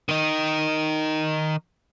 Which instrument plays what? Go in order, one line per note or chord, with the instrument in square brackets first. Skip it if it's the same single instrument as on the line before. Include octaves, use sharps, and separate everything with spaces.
[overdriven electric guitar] D#3 D#4